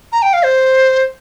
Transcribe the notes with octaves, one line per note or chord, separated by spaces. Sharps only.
A#5
G5
F5
C5